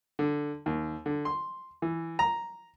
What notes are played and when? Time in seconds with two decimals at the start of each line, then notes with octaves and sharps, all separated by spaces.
0.19 D3
0.66 D#2
1.06 D3
1.25 C6
1.82 E3
2.19 A#5